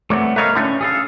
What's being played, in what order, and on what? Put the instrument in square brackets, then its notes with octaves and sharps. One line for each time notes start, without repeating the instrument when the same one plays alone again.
[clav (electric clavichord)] C2 C#5 D5 [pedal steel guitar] A3 B3
[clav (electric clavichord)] A3 A#4 D#5 [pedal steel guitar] B4 C#5 F5
[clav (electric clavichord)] A2 D3 A3 [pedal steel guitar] C#4
[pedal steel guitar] G#4 A4 F5